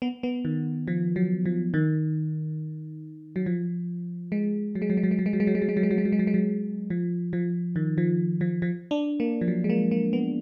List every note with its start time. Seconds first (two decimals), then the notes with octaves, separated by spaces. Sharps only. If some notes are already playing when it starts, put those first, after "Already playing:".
0.02 B3
0.23 B3
0.45 D#3
0.88 F3
1.16 F#3
1.46 F3
1.74 D#3
3.36 F#3
3.46 F3
4.32 G#3
4.75 F#3
4.82 G#3
4.90 F#3
4.97 G#3
5.03 F#3
5.11 G#3
5.19 F#3
5.26 G#3
5.33 F#3
5.40 G#3
5.47 F#3
5.55 G#3
5.62 F#3
5.69 G#3
5.77 F#3
5.83 G#3
5.91 F#3
5.98 G#3
6.05 F#3
6.12 G#3
6.19 F#3
6.27 G#3
6.34 F#3
6.90 F3
7.33 F3
7.76 D#3
7.98 F3
8.41 F3
8.62 F3
8.91 D4
9.20 A#3
9.41 F3
9.48 F#3
9.64 G#3
9.70 A#3
9.91 A#3
10.13 B3